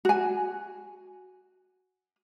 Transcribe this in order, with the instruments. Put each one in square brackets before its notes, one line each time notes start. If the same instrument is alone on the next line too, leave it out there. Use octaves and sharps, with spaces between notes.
[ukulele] F#4 G#5